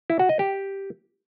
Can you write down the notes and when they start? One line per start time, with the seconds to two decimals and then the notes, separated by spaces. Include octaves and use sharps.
0.10 E4
0.19 F#4
0.29 D#5
0.39 G4